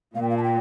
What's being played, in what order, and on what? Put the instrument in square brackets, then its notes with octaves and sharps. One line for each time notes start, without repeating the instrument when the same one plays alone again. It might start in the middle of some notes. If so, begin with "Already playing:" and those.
[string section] A#2 [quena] F5
[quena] G5
F5
A5
G5